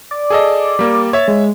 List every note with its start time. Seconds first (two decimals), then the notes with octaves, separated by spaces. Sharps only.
0.11 D5
0.30 G#4 A4 D#5
0.79 G3 A#3
1.13 C#5 E5 A6
1.28 G#3